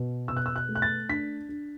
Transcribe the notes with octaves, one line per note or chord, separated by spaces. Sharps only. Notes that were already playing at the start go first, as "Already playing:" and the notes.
Already playing: B2
B2 E6
F#6
E6
F#6
A3
F#6
A6
D4 B6
D4